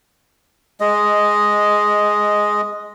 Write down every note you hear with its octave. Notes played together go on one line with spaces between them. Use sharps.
G#3 D#5